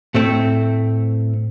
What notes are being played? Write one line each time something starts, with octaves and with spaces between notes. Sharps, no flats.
A2 A3 C4